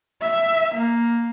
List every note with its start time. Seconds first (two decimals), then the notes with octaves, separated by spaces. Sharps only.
0.22 E5
0.74 A#3